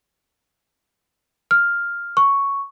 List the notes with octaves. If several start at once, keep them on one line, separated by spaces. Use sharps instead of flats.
F6
C#6